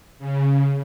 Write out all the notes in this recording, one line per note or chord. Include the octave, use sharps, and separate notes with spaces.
C#3